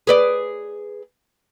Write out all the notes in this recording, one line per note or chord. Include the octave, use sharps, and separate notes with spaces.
G#4 B4 D5